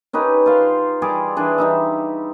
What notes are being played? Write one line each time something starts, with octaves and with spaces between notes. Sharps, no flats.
C#4 D#4 G4 B4
F4 F5 C6
G3 G#4 D5 D6
E3 D4 G#4
G3 D#4 E5